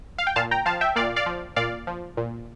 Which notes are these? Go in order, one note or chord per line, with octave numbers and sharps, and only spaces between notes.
F5
G5
A#2 F5 A5
G5 A#5
F3 F5 A5
E5 G5
A#2 D5 F5
D5 F5
F3
A#2 D5 F5
F3
A#2